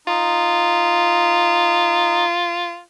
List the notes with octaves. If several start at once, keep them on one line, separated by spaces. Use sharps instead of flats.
D#4 F4